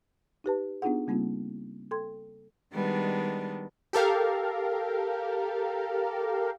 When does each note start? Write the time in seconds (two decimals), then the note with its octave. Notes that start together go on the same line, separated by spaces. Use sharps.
0.44 D#4 G4 B4 A5
0.82 B3 D4 D#4 F4 G#4 F#5
1.07 C#3 G3 A#3 C4 D#4 F4
1.91 A4 G5 C6 G#6
2.75 D#3 G3 G#3 B3 D4
3.93 G4 A4 A#4 F5